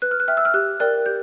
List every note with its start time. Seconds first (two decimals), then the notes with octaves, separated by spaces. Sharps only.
0.02 B4 F#6
0.11 F6
0.20 F#6
0.28 E5 G5 F6
0.37 E6
0.45 F6
0.54 G4 F#6
0.80 A#4 D5 G5 F#6
1.06 G4 G6